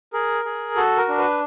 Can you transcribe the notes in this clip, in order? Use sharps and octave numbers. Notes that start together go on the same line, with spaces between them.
G#4 A#4
G#4
F#4 A4
A#4
D4
B4